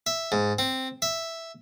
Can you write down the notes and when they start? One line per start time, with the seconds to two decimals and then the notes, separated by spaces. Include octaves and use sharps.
0.06 E5
0.32 G#2
0.59 C4
1.02 E5